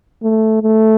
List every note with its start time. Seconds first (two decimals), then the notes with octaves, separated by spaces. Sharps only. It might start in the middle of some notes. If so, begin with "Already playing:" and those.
0.23 A3
0.63 A3